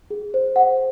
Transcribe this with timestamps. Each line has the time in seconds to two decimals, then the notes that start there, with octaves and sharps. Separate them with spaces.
0.10 G#4
0.34 C5
0.56 F#5